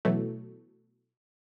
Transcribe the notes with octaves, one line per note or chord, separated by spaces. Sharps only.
B2 E3 F#3 A3